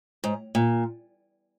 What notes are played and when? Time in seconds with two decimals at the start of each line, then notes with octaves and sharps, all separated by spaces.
0.24 G#2
0.55 A#2